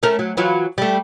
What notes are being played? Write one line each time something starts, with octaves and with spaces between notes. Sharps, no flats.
A3 C#4 A#4
F#3
E3 F#3 F4
G3 A3